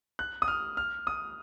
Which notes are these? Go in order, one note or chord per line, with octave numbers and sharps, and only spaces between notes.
F#6
D#6
F6
F6
D#6